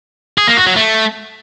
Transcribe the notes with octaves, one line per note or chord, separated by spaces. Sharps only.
G#4
A#3
F#4
F#3
A3